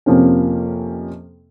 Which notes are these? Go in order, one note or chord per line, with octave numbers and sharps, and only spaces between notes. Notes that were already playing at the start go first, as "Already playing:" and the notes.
F2 C3 F3 A#3 C#4